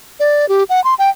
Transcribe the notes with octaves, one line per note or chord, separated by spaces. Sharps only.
D5
G4
F#5
C6
G5